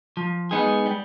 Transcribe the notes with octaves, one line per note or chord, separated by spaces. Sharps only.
F3
G#3 B3 D#4 G#4
G3